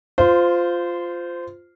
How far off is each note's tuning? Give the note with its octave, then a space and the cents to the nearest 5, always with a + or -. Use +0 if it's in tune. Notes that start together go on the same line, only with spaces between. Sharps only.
F4 +0 C5 -20